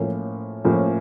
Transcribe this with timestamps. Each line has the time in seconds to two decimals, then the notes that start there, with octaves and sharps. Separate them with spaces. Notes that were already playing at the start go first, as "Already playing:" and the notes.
Already playing: A2 F3 A#3 C#4
0.65 A2 F3 A#3 C#4